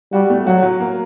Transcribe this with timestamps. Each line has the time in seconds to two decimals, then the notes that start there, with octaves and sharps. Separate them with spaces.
0.13 G3 F#4
0.30 A3
0.46 F#3 F#4
0.63 F#3
0.80 A#3